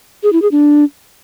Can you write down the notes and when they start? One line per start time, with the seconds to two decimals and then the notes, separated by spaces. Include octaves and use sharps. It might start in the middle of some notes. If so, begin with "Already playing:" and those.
0.23 G#4
0.33 E4
0.42 G#4
0.51 D4